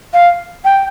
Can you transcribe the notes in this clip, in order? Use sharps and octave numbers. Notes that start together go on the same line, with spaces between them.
F5
G5